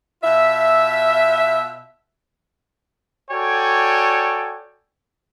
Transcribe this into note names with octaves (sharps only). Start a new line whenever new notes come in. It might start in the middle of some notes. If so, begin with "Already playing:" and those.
B2 F4 E5
F#4 A4 C#5 D5 G5 G#5